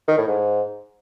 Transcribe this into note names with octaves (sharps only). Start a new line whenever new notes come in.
D#3
A2
G#2